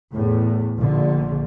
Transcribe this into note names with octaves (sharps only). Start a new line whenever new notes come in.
E2 A2
A#1 A#2 D3